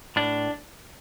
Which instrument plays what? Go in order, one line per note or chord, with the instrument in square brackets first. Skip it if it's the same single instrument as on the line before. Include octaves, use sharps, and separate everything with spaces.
[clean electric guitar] A2 D4